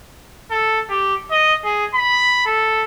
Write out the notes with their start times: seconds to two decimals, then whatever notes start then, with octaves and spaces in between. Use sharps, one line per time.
0.51 A4
0.90 G4
1.31 D#5
1.65 G#4
1.95 B5
2.46 A4